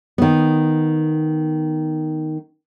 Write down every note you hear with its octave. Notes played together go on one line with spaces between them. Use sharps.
D#3 B3